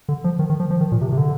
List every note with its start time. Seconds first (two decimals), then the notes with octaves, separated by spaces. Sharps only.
0.09 D3
0.24 F3
0.39 D#3
0.50 D#3
0.60 F3
0.70 F3
0.81 D#3
0.92 A#2
1.01 C3
1.12 C3
1.18 D3